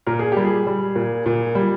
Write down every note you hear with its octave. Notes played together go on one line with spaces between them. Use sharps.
A#2 A#4
G#4
G3 G4
G#4
G3
A#2
A#2
G3